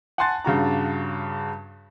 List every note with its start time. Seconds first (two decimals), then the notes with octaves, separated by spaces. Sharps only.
0.18 F#5 G#5 A5 C6 F#6 A6
0.45 G2 C#3 F#4 A#5